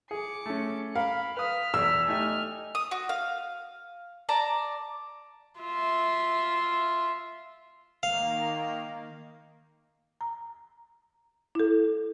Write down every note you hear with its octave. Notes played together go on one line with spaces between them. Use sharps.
G#4 D6 C#7
A3 C#4
A#4 F5 B5
B4 D#6 F6 B6
E2 E6
A3 D#4 G4 G#5 F6
D#6
F#4
F5
D5 A5 A#5
F4 E5
D#3 A#3 F5
A#5
E4 A4